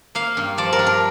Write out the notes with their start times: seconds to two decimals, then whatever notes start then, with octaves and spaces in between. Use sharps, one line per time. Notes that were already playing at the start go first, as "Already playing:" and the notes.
0.15 A#3 F5
0.37 G2
0.58 F3 D5
0.73 A#4
0.79 D4
0.86 A#4